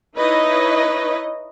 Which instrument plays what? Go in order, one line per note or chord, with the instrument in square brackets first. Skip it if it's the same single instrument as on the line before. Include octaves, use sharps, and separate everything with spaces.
[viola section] D#4 E4 B4 C#5 D#5